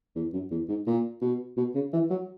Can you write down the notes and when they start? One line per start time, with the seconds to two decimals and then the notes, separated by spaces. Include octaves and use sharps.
0.16 E2
0.33 F#2
0.51 E2
0.68 G#2
0.87 A#2
1.21 B2
1.57 B2
1.75 C#3
1.93 E3
2.10 F#3